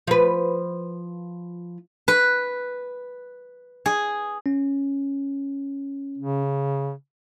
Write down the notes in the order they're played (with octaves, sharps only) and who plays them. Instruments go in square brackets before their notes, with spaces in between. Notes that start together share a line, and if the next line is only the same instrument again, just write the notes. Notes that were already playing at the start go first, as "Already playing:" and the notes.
[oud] F3 B4
[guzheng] B4
G#4
[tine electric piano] C#4
[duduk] C#3